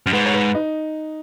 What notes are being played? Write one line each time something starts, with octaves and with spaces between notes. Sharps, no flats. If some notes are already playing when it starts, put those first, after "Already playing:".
F#2
G#2 B4
C#5
B4
D#4